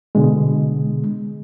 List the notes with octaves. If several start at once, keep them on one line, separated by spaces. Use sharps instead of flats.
B2 D3 G#3